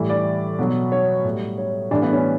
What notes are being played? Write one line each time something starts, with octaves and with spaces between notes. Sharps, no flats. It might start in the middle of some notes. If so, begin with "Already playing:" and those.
Already playing: A2 E3 G3
D5
B2 F#3
C#5
A2 G3
C#5
A2 E3 G3 D4
B3
C#4